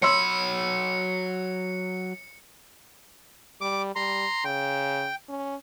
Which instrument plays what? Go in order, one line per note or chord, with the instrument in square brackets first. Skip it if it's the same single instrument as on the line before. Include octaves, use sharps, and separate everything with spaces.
[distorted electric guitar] F#3 B5 [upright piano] C#5 C6 E6 [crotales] C#7
[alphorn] G3 [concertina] D6
[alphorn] G3 [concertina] A#5 C6
[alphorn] C#3 [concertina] G5
[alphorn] C#4